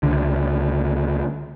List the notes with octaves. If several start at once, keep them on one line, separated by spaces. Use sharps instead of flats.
C#2 D3